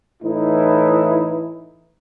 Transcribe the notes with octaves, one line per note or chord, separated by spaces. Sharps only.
A2 E3 D#4 E4